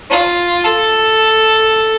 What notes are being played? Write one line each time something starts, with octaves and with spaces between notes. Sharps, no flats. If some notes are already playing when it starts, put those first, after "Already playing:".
F4
A4